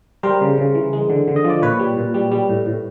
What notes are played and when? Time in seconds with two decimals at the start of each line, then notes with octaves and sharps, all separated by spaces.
0.23 G3 A#4 C5
0.41 C#3
0.58 C#3
0.75 E3
0.93 G#3
1.10 D3
1.28 D3
1.36 D#5
1.44 F3
1.50 D5
1.62 A#2 B4 C#5
1.79 G3
1.97 A#2
2.14 G3
2.32 G3
2.49 A2
2.66 A2